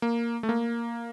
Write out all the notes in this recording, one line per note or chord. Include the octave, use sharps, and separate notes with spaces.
A#3
A3
A#3